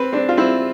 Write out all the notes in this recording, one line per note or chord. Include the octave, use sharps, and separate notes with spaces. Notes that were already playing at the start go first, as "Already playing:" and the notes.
Already playing: C4 B4
C4 D4
F4
C4 E4